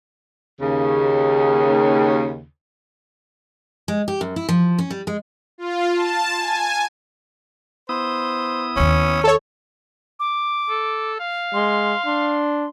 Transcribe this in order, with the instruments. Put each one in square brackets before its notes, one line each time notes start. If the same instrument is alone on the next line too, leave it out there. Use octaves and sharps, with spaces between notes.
[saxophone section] D#2 C#3
[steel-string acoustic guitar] G#3
G4
F#2
E4
F3
C#4
G3
G#3
[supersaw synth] F4
A5
G#5
[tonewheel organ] B3 E4 D#6 [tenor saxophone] C5
[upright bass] D#2 C4 [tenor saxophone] C#4
[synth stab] A4 C#5
[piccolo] D6
[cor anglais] A4
F5
[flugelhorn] G#3 [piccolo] C6
[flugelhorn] D4 [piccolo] C6